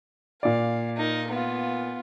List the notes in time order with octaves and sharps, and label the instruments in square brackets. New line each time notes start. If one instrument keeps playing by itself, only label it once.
[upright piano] A#2 D5 [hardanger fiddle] F5
[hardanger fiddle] D#4 A#4
B3 F4